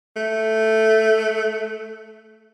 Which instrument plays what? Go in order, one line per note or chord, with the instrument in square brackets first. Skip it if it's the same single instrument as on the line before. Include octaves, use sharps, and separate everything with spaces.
[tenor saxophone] A3